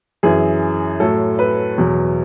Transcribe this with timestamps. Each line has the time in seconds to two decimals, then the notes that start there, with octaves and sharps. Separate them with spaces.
0.23 F#2 E3 G#4
1.00 A2 F#3 A4
1.39 B4
1.78 E2 B2 F#3